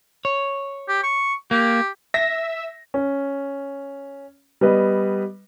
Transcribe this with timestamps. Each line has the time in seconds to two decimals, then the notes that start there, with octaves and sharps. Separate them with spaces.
0.25 C#5
0.89 G4
1.03 C#6
1.51 A#3 G4
2.14 E5 A#6
2.94 C#4
4.61 G3 B3 B4 D#5